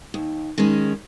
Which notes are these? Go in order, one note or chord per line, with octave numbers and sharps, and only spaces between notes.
D#2
D#3 G#3 C#4